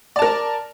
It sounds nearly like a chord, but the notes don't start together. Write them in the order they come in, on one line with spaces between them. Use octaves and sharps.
D5 A5 A#4